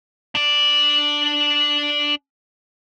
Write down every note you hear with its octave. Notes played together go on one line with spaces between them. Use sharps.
D4 D5